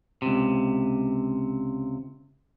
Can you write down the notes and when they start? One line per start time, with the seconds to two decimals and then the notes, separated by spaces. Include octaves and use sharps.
0.22 C#2 C3